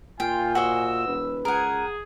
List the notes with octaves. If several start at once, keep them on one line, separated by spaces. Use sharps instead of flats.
A#2 F4 G5 G#5
F#4 C5 D#5 E6
E1 B4
C#2 G#4 A#4 F#5